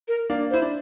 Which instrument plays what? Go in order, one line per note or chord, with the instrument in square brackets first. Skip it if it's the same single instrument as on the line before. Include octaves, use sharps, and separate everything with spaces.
[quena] A#4
[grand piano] A#3 D4
[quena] C5
[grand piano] E4
D4